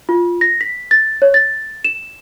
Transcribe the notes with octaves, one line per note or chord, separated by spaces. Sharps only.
F4
A#6
B6
A6
C#5
A6
E7